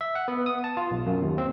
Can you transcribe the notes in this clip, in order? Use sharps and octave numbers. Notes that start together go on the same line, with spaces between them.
E5
F#5
B3
D#6
A5
F4
B1
F#2
D#2
C4